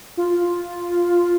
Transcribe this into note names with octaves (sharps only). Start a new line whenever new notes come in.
F4